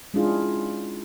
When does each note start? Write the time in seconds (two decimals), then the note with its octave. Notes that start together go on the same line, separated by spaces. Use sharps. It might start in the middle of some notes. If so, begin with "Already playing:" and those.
0.14 G#3 C#4 D4 E4 F4 G#4